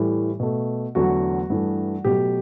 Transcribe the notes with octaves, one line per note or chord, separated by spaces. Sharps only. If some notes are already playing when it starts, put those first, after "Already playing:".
Already playing: A2 E3 G3
B2 A3
E2 D3 F#3 A3 F#4
G2 E3 A3
B2 F#3 A3 G4